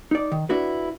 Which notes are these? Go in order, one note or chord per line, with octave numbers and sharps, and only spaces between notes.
D#4 D5
D#3
D4 E4 F#4 B4